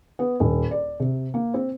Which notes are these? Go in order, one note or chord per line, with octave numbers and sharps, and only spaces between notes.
B3
D#1
D5
C3
A#3
C4